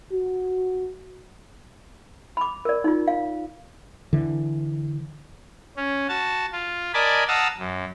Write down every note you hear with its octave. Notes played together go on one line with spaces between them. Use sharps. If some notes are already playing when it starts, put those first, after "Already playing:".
F#4
B5 D6
A#4 D5
D#4 F4
F5
D3 E3
C#4
F#4 A5
F4
A#4 D5 D#5 G#5 A5 B5
F5 F#5 A5 A#5 D#6 E6
F#2